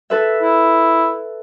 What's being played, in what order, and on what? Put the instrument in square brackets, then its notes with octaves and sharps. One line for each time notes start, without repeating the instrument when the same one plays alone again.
[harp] A4 B4 E5
[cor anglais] E4